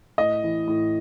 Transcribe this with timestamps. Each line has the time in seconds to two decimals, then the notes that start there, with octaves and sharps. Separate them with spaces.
0.18 A2 D#5
0.44 E3
0.68 A2